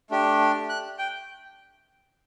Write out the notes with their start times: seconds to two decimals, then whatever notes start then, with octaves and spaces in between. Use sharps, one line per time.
0.11 A3 D4 G4
0.69 F#6
0.99 G5